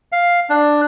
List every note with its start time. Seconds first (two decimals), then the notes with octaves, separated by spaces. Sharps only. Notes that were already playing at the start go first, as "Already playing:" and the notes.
0.12 F5
0.50 D4